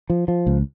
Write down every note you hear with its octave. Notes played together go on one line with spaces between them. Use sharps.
F3
F3
C#2